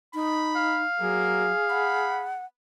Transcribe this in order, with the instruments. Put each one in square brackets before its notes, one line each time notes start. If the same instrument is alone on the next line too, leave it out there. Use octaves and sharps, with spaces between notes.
[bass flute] D#4 [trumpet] B5
[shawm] F5
[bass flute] F#3 [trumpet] A#3 [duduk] G#4
[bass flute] F#5 [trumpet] B5